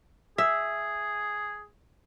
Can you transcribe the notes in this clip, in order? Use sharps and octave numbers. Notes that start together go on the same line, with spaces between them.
G#4 E5